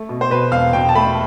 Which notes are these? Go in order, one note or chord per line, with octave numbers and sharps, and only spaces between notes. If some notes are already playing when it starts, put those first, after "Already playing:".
Already playing: A3
B2
C5
B2 B4
E1 F5
B2 G5
A5
A3 B5